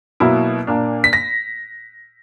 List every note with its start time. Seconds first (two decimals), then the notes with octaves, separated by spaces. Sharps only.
0.20 B2 F#3 A#3 E4
0.67 A#2 A#3 D4
1.04 B6
1.13 A#6